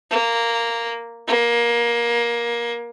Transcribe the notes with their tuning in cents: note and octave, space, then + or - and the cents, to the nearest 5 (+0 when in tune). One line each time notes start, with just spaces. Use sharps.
A#3 -5
A#3 +20